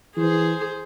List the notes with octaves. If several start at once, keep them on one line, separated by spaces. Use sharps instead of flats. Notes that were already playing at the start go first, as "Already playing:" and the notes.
E3 G#4 C5